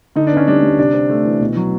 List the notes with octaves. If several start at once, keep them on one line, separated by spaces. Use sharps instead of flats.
D3 D#4
D4
B3
C#4
G3 D4
G3
C3 D4
C4
A3
E3
B2
F#3